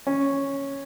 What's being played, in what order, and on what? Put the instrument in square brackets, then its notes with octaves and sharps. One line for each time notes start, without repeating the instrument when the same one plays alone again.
[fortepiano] C#4